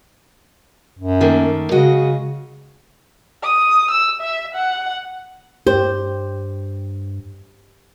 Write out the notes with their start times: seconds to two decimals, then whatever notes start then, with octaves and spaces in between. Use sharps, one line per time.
0.99 F#2
1.21 D#3 A3 A#3
1.71 C#3 G#3 F#4 D#5
3.43 D#6
3.91 E6
4.21 E5
4.55 F#5
5.67 G2 G4 C5